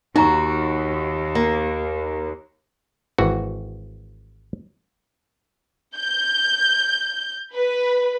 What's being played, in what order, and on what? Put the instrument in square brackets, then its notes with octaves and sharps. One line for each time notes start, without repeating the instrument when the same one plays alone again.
[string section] D#2 [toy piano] D#4 A#5 C#6 [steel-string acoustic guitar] F#4
[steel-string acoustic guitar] A#3
[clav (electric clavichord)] G#1 E3 F#4
[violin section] G6
B4